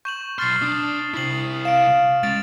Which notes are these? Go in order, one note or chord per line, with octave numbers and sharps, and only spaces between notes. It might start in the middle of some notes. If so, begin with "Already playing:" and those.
C#6 G6 E7 F#7
B1 C6 F6 A6 C7
D4 D#6
C3 E4 C7 F#7
F5 D7 E7
G#3 C#4 A6 D7 F7